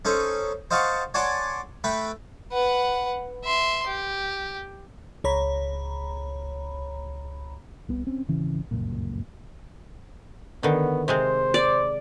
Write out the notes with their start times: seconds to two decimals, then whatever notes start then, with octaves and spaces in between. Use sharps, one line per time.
0.05 C#4 D#4 A4 C5
0.71 C5 D#5 F5 F#5 A5 C#6
1.14 C#5 D5 F#5 G#5 A5 C6
1.84 A3 B4 G5 B5
2.52 B4 F#5
3.44 E5 C6
3.87 G4
5.24 C#2 C#5 A#5 B5
7.89 C2 B3
8.07 C4 C#4
8.28 G#1 C#3 E3 C#4
8.71 G1 C#2 F#2 A#2
10.63 D3 D#3 B3
11.08 C3 G#3 C4 C5
11.54 D5